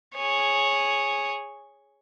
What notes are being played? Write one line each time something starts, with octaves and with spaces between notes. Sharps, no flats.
G#4 C#5